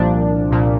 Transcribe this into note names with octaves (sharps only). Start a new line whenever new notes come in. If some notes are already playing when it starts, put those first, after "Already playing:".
Already playing: C2 A#2 F3 D4
C2 A#2 F3